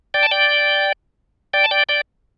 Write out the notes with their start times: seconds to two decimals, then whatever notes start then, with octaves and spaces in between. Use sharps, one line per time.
0.14 D5 G5
0.23 A5
0.31 D5 G5
1.53 D5 G5
1.64 A5
1.71 D5 G5
1.89 D5 G5